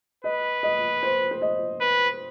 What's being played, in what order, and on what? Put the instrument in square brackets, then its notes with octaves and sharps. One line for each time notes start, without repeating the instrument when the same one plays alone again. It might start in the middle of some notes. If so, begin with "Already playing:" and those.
[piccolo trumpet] B4 [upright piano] D#5
[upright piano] D#5
C5
C5
D#5
[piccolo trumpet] B4